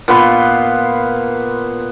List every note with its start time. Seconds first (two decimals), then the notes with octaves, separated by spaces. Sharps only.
0.08 A#2 B3 B4 C6